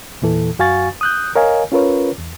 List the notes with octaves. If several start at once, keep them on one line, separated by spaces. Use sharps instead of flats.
E2 A#2 E3 A4
F#2 F#4 F5 G#5 C#6 A6
D#6 F#6 G6
A#4 C#5 D#5 F5 G#5
C#4 F4 A#4 B4 C#5
E2